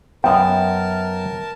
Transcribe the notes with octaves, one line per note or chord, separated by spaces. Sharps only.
F#2 B3 A#4 G5 A5